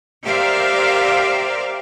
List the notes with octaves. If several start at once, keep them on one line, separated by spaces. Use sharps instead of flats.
G4 A#4 C5 D5 E5 F5